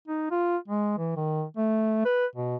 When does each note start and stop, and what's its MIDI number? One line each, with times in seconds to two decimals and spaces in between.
0.08 0.29 63
0.31 0.57 65
0.68 0.95 56
0.98 1.14 52
1.16 1.44 51
1.57 2.02 57
2.05 2.26 71
2.35 2.56 47